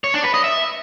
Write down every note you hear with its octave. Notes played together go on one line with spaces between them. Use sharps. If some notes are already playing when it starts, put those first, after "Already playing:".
C#5
D4
B4
D#5
E5